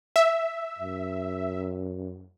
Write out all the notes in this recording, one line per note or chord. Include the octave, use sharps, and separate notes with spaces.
E5
F#2